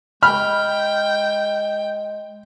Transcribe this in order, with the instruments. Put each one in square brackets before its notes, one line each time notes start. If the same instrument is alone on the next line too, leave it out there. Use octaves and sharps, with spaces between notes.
[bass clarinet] G#3 [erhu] G5 [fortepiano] B5 F6